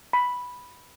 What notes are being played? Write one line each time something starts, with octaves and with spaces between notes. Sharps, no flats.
B5